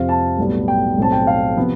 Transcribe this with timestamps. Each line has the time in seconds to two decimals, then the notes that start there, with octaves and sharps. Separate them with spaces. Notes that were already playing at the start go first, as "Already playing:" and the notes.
Already playing: F2 C3 F3 C4 F5
0.09 A5
0.38 B1 A2 G3 B3
0.68 G5
0.97 B1 A2 G3 C4 A5
1.12 G5
1.27 F5
1.57 C3 F3 B3